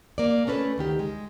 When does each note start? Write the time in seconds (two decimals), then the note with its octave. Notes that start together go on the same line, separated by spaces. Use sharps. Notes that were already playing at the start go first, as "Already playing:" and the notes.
0.18 A#3 D5
0.47 A3 C#4 A4 B4
0.78 D2 D#3 G4
0.99 G#3